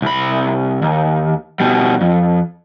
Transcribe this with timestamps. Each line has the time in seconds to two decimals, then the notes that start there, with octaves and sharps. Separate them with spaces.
0.02 C2 B5
0.82 D#2
1.60 B2 G3
2.01 F2